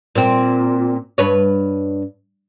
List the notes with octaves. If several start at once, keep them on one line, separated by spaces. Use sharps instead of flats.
A#2 C4
G2 B4 C#5